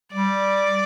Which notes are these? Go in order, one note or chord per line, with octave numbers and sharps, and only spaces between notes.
G3 D5